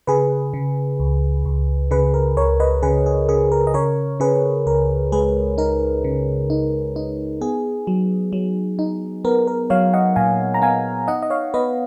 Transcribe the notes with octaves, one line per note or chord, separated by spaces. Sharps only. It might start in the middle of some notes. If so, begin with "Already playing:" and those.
C#3 G#4 B4
C#3
C#2
C#2
C#3 G#4 B4
A#4
C#2 A#4 C#5
B4 D#5
C#3 G#4 B4
G#4
C#3 G#4
A#4
D#5
C#3 A#4 C#5
C#3 G#4 B4
C#2 A#4
G#3 G#4 B4
D#4 A#4
C#3
D#4
D#4
B3 G#4
F#3
F#3
D#4
B3 A#4
A#4
F#3 C#5 F5
D#5 F#5
A#2 F5 G#5
A#5
B3 F5 G#5
D#4 D#5 F#5
D#5
C#5 F5
B3 B4 D#5